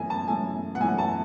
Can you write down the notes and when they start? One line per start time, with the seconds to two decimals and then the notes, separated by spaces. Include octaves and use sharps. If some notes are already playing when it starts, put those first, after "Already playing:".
Already playing: F#2 E3 A3 G#5
0.10 A5
0.28 F#2 E3 A3 G#5
0.75 F#5
0.80 F#2 E3 A3 G#5
0.98 A5